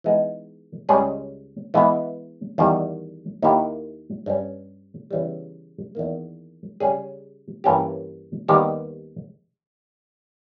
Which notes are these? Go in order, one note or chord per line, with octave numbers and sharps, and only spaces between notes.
E3 G#3 B3 D#4
C#2 C#3 G3 C#4 G#4
E3 G#3 B3 E4
E2 D#3 G3
D#2 D#3 A#3 E4 G4
G2 G3 C#4
E2 C#3 E3 G3
E2 D#3 A#3
C#3 G3 C#4 G#4
G2 E3 A#3 C#4 G4
D#2 D#3 G3 B3 G4